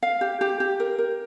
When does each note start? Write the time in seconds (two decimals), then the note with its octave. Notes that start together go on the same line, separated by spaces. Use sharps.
0.03 F5
0.21 G4
0.41 G4
0.60 G4
0.80 A#4
0.98 A#4